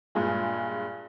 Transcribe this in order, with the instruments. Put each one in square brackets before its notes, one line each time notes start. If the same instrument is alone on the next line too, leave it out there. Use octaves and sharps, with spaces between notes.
[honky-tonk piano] G2 A#2 G#3